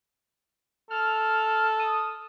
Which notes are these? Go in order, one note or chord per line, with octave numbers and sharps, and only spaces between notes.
A4 F6
D#6